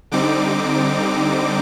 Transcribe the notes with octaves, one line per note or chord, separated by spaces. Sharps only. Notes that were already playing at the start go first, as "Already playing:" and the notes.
D3 G3 C4 D#4 D6